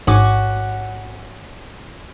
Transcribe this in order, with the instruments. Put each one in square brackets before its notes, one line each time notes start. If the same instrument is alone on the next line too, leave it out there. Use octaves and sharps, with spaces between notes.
[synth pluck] A1 G#2 D6 [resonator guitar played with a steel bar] C#4 F#4